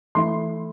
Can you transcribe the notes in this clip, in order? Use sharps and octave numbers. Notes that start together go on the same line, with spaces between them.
E3 A3 E4 C6